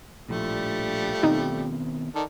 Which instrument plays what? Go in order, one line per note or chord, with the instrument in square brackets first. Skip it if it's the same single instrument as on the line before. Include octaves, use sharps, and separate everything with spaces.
[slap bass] A#1 A2 [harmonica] F3 G3 A3
[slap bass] B2 D#3 C4 [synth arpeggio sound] D#4
[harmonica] D#3 A4 D5